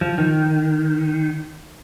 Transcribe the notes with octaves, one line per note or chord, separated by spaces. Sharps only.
F3
D#3